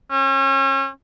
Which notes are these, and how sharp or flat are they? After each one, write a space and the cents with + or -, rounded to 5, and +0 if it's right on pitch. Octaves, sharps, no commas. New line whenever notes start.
C#4 -35